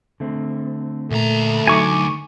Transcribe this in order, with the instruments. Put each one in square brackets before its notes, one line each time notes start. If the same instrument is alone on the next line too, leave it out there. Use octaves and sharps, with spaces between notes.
[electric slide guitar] D3 A3 C4
[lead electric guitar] D2 A#5 [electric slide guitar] A#2 [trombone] A3
[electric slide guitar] F#3 D#4 F#4 [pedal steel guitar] G#5 C#6 D6